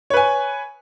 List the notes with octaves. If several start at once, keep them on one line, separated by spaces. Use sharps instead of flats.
B4 C#5 G#5